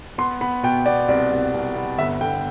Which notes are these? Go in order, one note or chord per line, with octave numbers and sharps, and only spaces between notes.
B3 C6
B3 B5
B2 G5
B3 D5
C2 D5
C2
C2
B3
G1 E5
D3 G5